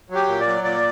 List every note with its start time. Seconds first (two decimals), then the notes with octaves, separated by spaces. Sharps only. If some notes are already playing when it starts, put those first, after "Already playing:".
0.10 F#3
0.15 G4
0.28 A#2
0.40 D5
0.47 F#3
0.63 A#2 D5